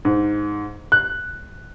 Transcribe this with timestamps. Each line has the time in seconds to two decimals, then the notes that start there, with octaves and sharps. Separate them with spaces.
0.05 G#2
0.92 F#6